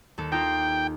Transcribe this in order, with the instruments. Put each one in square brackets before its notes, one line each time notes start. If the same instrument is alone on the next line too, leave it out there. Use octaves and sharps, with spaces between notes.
[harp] D#2 A4
[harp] D#4 F4 [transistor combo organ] G5